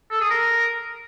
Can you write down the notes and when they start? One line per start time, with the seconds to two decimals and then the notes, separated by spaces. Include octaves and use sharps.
0.11 A4
0.21 G#4
0.30 A#4